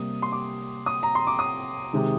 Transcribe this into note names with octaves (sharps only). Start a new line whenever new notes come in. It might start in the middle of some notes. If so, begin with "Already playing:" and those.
Already playing: C3 G3 A#3 D#6
C6
D6
D#6
A#5
C6
D6
D#6
C3 D#3 G#3